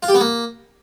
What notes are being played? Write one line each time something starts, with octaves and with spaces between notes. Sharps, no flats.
F4
G4
B3
A#3